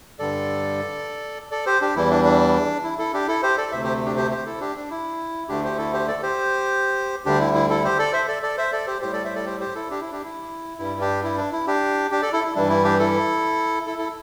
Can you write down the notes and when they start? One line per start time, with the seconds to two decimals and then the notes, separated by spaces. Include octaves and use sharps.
0.19 G2 D3 G3 A4 D5
1.51 A4 D5
1.66 G4 C5
1.81 D4 G4
1.95 E2 E3 G3 E4
2.11 D4
2.25 D4
2.84 E4
2.99 E4 A4
3.13 D4 G4
3.28 E4 A4
3.43 G4 C5
3.58 A4 D5
3.72 D2 C3 A3 C5 E5
3.84 G4 C5
4.05 D4 G4
4.16 G4 C5
4.31 G4 C5
4.46 E4 A4
4.60 D4 G4
4.76 D4
4.91 E4
5.49 D2 D3 A3 D4 G4
5.64 G4 C5
5.78 E4 A4
5.93 G4 C5
6.08 A4 D5
6.22 G4 C5
7.25 D2 D3 G3 D4 G4
7.40 E4
7.54 E4
7.70 E4 A4
7.84 G4 C5
7.98 A4 D5
8.13 C5 E5
8.28 A4 D5
8.43 A4 D5
8.58 C5 E5
8.72 A4 D5
8.87 G4 C5
9.02 A2 G3 G4 C5
9.13 A4 D5
9.24 C5 E5
9.35 A4 D5
9.46 G4 C5
9.61 G4 C5
9.75 E4 A4
9.90 D4 G4
10.01 E4
10.12 D4 G4
10.24 E4
10.78 G2 G3 E4
11.00 D4 G4
11.23 E4
11.37 D4
11.52 E4
11.67 D4 G4
12.11 D4 G4
12.22 A4 D5
12.33 E4 A4
12.44 E4
12.55 G2 E3 G3 D4
12.69 E4
12.84 D4 G4
12.99 E4 A4
13.87 E4 A4
13.98 E4 A4